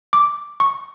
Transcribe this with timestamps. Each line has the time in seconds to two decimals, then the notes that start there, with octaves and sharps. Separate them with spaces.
0.13 D6
0.60 C#6